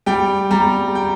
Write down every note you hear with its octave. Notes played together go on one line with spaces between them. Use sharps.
G3 G5
G3 A#5
G5